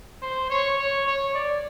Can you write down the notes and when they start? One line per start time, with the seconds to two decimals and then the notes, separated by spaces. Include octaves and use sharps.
0.22 C5
0.50 C#5
0.79 C#5
1.07 C#5
1.34 D5